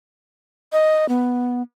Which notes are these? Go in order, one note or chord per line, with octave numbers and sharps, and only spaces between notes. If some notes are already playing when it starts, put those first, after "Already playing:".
D#5
B3